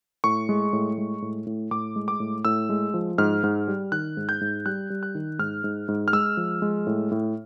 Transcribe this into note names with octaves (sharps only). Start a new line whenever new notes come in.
A2 C#6
G#3
A2
G#3
A2
A2
A2 D6
G#3
D6
A2
A2 E6
G#3
F3
G#2 F6
G#2
G3
D#3 F#6
G#2
G6
G#2
G3 F#6
G3
F#6
D#3
G#2 F6
G#2
G#2
F6
G#3 E6
F3
G#3
A2
A2